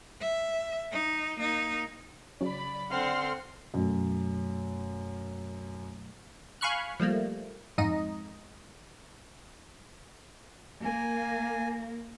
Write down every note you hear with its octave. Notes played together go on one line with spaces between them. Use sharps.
E5
D#4
A#3 D#4
C#3 F#3 C#4 D5 B5
D3 C4 F#5 C6 F6
F#2 B2 F#3 A3
F5 G#5 B5 C#6 F6 F#6
F3 G3 A3 A#3
F2 G#2 D#4 D#5
A#3 G#5